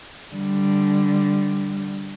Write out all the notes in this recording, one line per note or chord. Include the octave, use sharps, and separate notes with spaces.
D3 G3